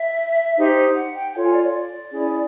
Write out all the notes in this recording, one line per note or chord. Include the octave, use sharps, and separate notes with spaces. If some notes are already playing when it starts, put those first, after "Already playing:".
Already playing: E5
D#4 G4 C5
F#5
G5
F4 A4 C#5 G#5
G#5
D5
C#5
D5
C#4 E4 G#4